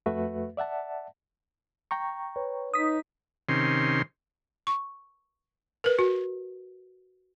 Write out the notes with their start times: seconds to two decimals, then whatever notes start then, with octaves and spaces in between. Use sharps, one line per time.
0.06 F2 A3 F#4 B4 E5
0.57 D5 E5 F#5 A5
1.91 G5 A#5 C#6
2.36 B4 C#5
2.74 D#4 D#6 B6
3.49 C3 D#3 C#4 C6
4.67 C#6
5.84 A#4 B4
5.99 F#4